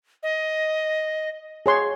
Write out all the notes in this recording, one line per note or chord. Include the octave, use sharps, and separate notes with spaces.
D#5
G#4 C#5 C6